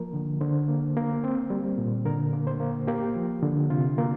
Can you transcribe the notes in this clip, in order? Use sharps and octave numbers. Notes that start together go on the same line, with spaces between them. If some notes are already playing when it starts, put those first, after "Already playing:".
Already playing: F3 A#3 A#4
D3
D3 C5
A#3
A#3
C4
G3
A#2
D3 A#4
A#3
C5
A#3
A#3 G4
F3
D3
C3 F4
A#3